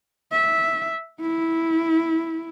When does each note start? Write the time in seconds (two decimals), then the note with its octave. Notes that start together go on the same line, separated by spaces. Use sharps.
0.32 E5
1.21 E4